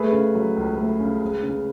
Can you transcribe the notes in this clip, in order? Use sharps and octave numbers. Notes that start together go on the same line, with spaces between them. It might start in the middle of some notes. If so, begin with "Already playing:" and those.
Already playing: A3 G#4 B4
C#3
F#3
C#2
A3
C#3
G#3
C#3